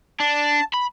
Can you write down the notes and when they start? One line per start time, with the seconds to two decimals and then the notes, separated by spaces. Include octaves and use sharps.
0.20 D4 A5
0.74 B5